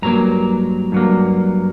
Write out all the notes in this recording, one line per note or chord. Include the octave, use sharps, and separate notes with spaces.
G2 F#3 A#3 A#5
G2 F#3 A#3